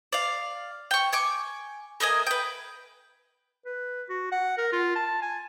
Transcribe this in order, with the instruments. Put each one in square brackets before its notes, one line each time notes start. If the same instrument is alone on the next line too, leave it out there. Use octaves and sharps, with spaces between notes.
[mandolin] D5 F5
G5 C#6
G#5 C#6 D6
A3 A#3 D#5 G#5
B4 G5
[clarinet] B4
F#4
F#5
A#4
F4
A5
G#5